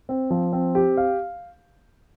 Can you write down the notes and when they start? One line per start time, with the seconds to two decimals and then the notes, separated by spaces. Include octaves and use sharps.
0.09 C4
0.30 F3
0.53 C4
0.75 G4
0.97 F5